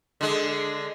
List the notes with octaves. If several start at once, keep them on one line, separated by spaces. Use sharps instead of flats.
D3 G#3